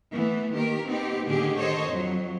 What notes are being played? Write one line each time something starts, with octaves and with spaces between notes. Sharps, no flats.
E3 A3 B3
D#3 A#3 G4 A#4
B3 C4 D#4 G4
A2 D3 D#3 G4 G#4
D#3 A4 C5 C#5 D#5
F2 F#3